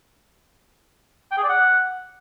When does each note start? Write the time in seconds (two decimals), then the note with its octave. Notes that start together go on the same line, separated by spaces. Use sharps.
1.32 G5
1.38 G#4
1.43 D5
1.49 F#5